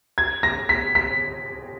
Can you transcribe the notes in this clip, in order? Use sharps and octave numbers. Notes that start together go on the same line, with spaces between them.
G#6
A#6
B6
B6